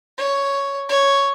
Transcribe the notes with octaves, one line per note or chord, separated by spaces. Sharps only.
C#5
C#5